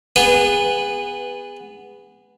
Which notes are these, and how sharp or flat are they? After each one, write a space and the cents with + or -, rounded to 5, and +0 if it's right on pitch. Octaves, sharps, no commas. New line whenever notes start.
B3 +0 G#4 -30 B4 -5